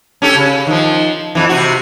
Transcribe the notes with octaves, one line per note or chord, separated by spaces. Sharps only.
C#4 G4 A4
C#3
D#3 F3
F2 E3
C3 F#4